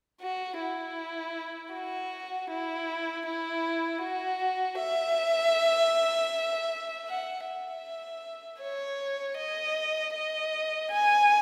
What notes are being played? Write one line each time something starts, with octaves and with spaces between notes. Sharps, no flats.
F#4
E4
F#4
E4
E4
F#4
E5
F#5
E5
C#5
D#5
D#5
G#5